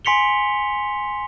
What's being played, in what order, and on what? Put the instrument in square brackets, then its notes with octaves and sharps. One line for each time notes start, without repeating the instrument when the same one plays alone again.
[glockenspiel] G#5 C6 B6 C#7 F7 G7